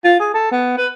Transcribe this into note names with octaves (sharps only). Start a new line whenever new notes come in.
F4
G#4
A4
B3
B4